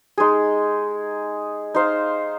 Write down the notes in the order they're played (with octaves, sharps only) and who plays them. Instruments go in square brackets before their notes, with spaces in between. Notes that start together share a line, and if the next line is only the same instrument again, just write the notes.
[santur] G#3 D#4 G#4
D#4 C5 F5